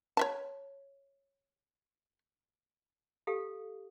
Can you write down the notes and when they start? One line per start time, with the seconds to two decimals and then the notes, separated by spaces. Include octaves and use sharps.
0.17 C#5 E5 A5
3.27 G4 A4 F5